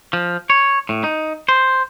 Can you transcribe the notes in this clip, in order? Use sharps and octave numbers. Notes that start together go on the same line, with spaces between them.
F3
C#5
A2
D#4
C5